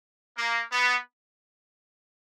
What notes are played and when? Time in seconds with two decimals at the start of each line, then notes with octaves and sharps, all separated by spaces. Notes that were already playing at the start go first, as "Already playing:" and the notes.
0.38 A#3
0.71 B3